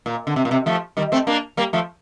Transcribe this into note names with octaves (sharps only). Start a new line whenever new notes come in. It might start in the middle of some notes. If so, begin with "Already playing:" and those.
A#2
D3
C3
A#2
C3
F3 A3
D#3 G3
A3 C4
A#3 D4
G3 A#3
F3 A3